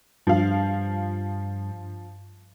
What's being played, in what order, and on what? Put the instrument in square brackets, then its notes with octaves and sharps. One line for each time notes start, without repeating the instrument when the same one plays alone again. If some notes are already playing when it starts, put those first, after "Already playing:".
[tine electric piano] G2 [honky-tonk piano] F3 F5